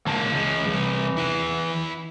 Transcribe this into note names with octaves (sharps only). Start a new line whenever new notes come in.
C#2 E3 A#3 A5
C#2 G#3
C2
E4 F#5